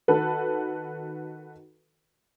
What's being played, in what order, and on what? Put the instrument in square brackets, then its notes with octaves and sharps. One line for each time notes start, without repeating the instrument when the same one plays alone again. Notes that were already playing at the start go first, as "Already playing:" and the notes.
[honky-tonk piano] D#3 F#4 A4 B4